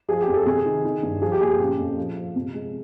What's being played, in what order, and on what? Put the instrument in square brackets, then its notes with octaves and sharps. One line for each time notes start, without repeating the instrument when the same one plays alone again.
[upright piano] F3 G#4
G4
F2
A4
C3 G#4
D#3
D#3
G2
F3 G#4
G4
A#2 G#4
G4
C#3
F2
F3
F3
C3
G#3